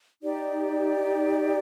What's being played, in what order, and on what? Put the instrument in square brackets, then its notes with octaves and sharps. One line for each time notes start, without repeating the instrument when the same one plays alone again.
[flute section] D#4 G4 D5